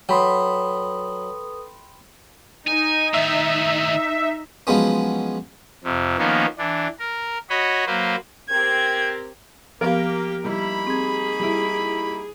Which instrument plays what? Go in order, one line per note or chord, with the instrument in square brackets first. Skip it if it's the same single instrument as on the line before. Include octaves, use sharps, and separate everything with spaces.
[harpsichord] F#3 [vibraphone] A4 B4 D#6 [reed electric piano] G5 B5 C6
[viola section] D#4 [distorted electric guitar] G#5
[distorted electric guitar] A2 D#3 [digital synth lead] E5
[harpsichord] F3 F#3 G#3 B3 C#4
[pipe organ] F2 C3
D#3 F3 A#3 B3 C#4
E3 D4
A#4
F#4 C#5 D#5 B5
F#3 A#3 B4 C5
[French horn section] C4 G4 A#4 [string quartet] G#6
[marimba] F3 B3 F5 [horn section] A#3 [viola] G4 [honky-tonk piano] A#4
[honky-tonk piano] G3 [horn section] A#3 D#4 B5 [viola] E4
[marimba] C4 G#6 [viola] G#4
[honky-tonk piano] G3 E4